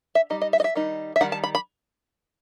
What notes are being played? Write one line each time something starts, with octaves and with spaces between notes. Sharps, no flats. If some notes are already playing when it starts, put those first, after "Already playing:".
E5
G3 D#4 D#5
D#5
E5
D#5
E5
D#3 G3 D#4
E5
D#3 G3 D#4 F#5
A5
B5
B5